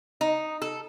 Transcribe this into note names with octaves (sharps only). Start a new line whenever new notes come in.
D#4
A4